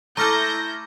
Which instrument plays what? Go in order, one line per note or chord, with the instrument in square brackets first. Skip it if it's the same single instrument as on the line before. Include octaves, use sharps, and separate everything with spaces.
[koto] A3 A4 [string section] E4 G6 A#6 [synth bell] A#5 D6 F6